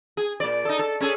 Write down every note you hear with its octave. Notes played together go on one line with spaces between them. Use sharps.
G#4
A#2 D5
D#4 A4
A4
C#4 G#4 A4